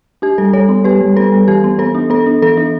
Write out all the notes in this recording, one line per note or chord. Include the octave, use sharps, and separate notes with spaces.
D4 G4
G3 A4
G3 A4 C#5
B3
G3 G4 B4
G3
B3 A4
G3
E3 G4
B3
B3 A4
D4
B3 A4
D4
E3 A4
D4